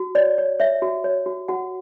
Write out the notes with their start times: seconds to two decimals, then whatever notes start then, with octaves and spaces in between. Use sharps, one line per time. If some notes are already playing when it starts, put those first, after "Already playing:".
Already playing: F#4
0.15 C#5 D5
0.38 C#5
0.60 C#5 E5
0.82 F#4
1.04 C#5
1.26 F#4
1.48 F#4 F#5